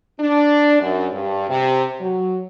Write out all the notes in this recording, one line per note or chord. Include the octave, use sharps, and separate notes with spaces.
D4
F#2
G2
C3
F#3